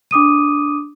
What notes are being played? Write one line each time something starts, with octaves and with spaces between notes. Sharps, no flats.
D4 D6 D#6 D#7